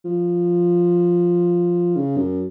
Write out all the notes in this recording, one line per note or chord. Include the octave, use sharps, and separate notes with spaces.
F3
C#3
F#2